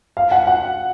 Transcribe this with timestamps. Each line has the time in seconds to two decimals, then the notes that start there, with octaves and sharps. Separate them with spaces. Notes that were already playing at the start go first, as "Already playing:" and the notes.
0.17 F5
0.31 F#5
0.47 F#5